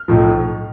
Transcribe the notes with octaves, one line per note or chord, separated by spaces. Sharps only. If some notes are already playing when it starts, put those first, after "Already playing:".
Already playing: F6
B1 A2 F3